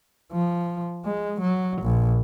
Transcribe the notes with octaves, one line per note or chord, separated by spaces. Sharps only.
F3
G#3
F#3
A#1